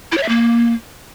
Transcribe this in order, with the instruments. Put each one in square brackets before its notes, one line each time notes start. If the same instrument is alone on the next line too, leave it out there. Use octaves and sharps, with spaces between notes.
[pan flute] E4
C#5
E5
A#3